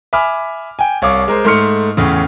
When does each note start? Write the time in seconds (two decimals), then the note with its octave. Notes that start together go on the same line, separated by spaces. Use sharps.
0.13 E5 G#5 B5 D6 F6
0.79 G5 G#5
1.02 C2 C#5 F5 D6
1.28 G#3 A#4 C5
1.45 G#2 A3 C6 F6 C#7
1.97 E2 A2 C#3